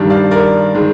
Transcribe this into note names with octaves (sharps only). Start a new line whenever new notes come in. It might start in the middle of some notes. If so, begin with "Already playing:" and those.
Already playing: G2 D#3 G3 D4
D5 F5
A#4 D5
D#3 G#3